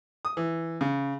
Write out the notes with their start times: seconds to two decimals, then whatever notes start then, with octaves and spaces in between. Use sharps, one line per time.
0.25 D#6
0.37 E3
0.81 C#3